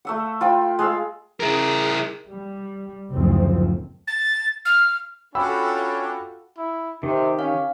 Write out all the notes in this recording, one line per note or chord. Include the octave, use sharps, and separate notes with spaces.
A3 E5 F#5
F4 G5 B5
G#3 F5 E6
E4 G#4 A#4
G3
F#1 D2 A2 D#3 F3 C4
A6
F6
C#4 D4 F4 F#4 A4 G5 B5 E6
E4
C3 D#3 G4
C#4 F5